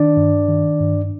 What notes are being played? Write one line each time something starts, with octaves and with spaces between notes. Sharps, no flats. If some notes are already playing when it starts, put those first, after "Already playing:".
Already playing: D#3 D4 D5
G2
D#3
G2